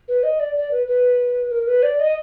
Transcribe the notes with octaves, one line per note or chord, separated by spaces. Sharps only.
B4
D#5
D5
D5
B4
B4
A#4
B4
D5
D#5